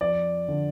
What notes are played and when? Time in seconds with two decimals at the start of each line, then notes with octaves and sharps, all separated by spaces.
0.01 F2 D5
0.48 D3